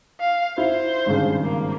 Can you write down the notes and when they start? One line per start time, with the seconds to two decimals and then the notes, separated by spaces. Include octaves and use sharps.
0.20 F5
0.58 E4 C5
1.06 G#1 G2 C#3
1.43 A#3